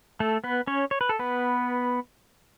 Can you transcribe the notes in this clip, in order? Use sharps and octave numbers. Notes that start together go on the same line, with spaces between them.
A3 A4
B3 B4
C#4 C#5
C#5
B4
A4
B3 B4